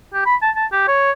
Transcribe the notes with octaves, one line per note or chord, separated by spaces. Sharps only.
G4
B5
A5
A5
G4
C#5